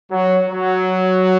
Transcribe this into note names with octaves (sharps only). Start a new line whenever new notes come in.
F#3
F#3